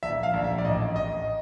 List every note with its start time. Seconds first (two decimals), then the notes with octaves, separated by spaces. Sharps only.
0.03 A#1 E5
0.23 F5
0.34 A#1
0.44 E5
0.58 D5
0.65 A1 D#5
0.96 A1 D#5